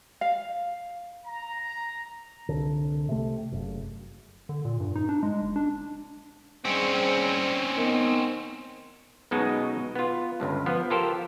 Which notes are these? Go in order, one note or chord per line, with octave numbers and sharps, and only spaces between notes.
F5
A#5
C2 D3
C3 A3
F#1
D3
A#2
G2
D#4
D4
G#3
F#1
D4
G#2 G3 C4 C#4
D#3 B3
B1 F#2 B2 G#3 D#4 F#4
B3 F4
G1 C#2 G2
F3 B3
F4 G4 A4 A#4 C5